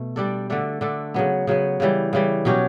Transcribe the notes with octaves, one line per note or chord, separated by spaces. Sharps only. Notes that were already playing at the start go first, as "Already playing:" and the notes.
Already playing: B2 A3
G3 D4 A4
D3 A3 D4 A4
D3 A3 D4 A4
C#3 F#3 B3
C#3 F#3 B3
C#3 E3 G3
C#3 E3 G3
B2 F#3 C#4 G4